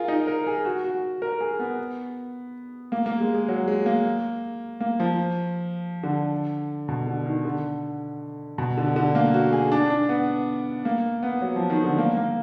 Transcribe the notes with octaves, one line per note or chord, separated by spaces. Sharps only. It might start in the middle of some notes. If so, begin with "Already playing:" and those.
Already playing: F4 G#4 A#4
D#4
A#4
G#4
F#4
F#4
A#4
G#4
B3
A#3
A#3
G#3
G#3
F#3
G#3
A#3
A#3
F3
D3
B2
D3
D#3
D3
B2
D3
D3
A#3
F#4
G#4
D4
D4
B3
A#3
B3
F#3
F3
D#3
D3
A#3
A#3